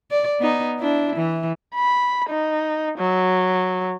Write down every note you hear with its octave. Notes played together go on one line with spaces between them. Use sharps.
D5
B3 D#4
D4 E4
E3
B5
D#4
F#3